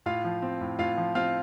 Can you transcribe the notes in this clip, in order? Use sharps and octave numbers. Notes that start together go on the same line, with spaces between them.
A2 F4 F5
F3
C4
A2
A2 F4 F5
F3
C4 F4 F5